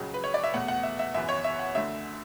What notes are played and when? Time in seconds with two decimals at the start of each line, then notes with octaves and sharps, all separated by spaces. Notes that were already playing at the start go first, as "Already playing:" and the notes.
Already playing: C#2 C#3 F#3
0.14 B4
0.24 C#5
0.34 D5
0.44 E5
0.54 E2 B2 A3 F#5
0.68 F#5
0.83 E5
0.99 E5
1.14 G#1 F#2 E3 B3 E5
1.29 C#5
1.44 E5
1.59 F#5
1.75 D2 D3 A3 E5